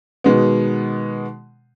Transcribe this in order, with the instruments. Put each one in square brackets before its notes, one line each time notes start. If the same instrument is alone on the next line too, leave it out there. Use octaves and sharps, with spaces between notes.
[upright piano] B2 D#3 G#3 B3